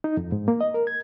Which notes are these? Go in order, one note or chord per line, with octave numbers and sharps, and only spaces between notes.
D#4
F2
G#2
A#3
D#5
A#4
G#6